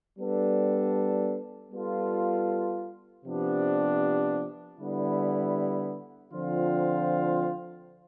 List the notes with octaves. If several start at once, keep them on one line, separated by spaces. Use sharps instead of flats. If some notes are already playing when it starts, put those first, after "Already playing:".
G3 B3 D4 A4
G3 B3 F4 A4
C3 F3 B3 D4 G4
D3 G3 B3 E4
D3 F3 C4 F4